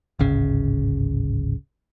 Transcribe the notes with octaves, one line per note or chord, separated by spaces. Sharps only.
D1 G#1 C#3